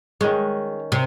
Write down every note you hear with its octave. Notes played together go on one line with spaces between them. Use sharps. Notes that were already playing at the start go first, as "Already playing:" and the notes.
D#3 G#3 C#4
C3